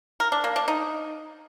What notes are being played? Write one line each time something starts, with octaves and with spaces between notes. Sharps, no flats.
A#4
D4
A#3
D4
D#4